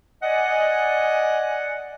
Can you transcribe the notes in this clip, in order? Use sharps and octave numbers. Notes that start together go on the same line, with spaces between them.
D5 D#5 F#5 G#5